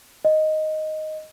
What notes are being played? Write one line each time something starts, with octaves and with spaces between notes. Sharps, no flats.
D#5